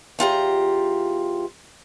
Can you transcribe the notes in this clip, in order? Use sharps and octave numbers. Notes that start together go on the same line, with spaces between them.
E2 F4 G4 A#5